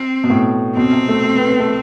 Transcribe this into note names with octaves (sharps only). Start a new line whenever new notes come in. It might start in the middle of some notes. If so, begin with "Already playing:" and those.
Already playing: C4
B2
A2
B2 C4
C3
A3
A3
B3
B3
A3